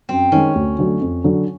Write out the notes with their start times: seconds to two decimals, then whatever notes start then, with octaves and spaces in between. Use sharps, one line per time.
0.09 F#2 C4
0.32 D#3 G#3 C#4
0.55 D2
0.79 D3 F#3 A3
1.01 F2
1.24 D3 F#3